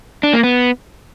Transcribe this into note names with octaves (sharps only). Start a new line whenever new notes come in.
D4
A#3
B3